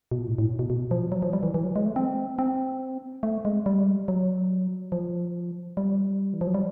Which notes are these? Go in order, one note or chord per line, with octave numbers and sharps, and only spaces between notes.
B2
A#2
A2
A2
B2
B2
F3
F#3
F3
G3
E3
E3
F#3
G#3
A3
C4
C4
A3
G#3
G3
F#3
F3
G3
E3
F3
F#3
G3